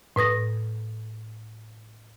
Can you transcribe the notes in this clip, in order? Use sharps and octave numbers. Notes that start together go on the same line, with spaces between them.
A2 B4 D#6 A#6